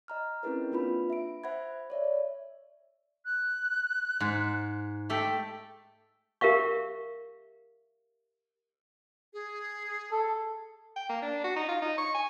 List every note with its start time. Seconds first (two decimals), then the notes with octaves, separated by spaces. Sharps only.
0.08 D#5 A#5 F6
0.43 C4 C#4 E4 G#4 A#4 B4
0.72 A#3 D4 F4 B4 B5
1.10 E5 D7
1.44 C5 E5 F#5 B5 G#6
1.90 C#5 D5 E5
3.25 F#6
4.20 G#2
5.10 A3 G4 A4 G5
6.41 G4 A#4 E5 F5 C#6
9.33 G#4
10.12 A4
10.96 G5
11.10 A#3
11.22 D4
11.44 F#4
11.56 D#4
11.68 F4
11.82 D#4
11.98 C#6
12.15 G#5